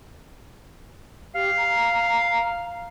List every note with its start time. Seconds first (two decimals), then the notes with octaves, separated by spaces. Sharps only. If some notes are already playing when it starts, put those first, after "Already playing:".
1.35 G4 F5
1.57 A#5